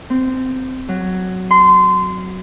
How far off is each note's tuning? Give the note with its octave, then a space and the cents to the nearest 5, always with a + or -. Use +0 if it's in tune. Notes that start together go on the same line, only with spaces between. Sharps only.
C4 -15
F#3 +5
C6 -25